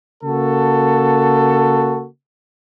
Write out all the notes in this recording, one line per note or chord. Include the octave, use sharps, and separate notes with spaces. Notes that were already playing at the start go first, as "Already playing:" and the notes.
C#3 A#3 F#4 A4